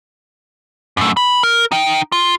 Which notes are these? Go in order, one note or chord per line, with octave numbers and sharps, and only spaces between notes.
F#2 A3
B5
A#4
D#4 G5
F4